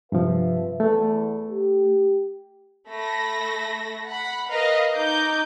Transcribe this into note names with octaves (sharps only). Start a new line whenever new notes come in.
G2 C3 F3 B4 E5
E2 A3
G4
A3 B5 A#6
F#5 B5
A#4 B4 D#5 F5
D#4 D6 G6